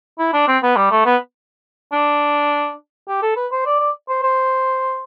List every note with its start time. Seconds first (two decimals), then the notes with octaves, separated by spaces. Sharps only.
0.19 E4
0.33 D4
0.48 C4
0.63 B3
0.76 G3
0.91 A3
1.06 B3
1.92 D4
3.08 G4
3.22 A4
3.36 B4
3.52 C5
3.66 D5
3.80 D5
4.09 C5
4.23 C5